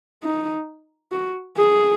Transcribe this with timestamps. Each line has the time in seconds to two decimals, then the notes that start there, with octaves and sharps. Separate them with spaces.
0.23 D#4
1.12 F#4
1.58 G#4